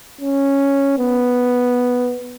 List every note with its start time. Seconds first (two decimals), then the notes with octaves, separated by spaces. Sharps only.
0.21 C#4
0.99 B3